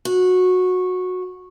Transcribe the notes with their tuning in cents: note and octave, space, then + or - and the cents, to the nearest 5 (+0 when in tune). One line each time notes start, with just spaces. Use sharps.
F#4 -15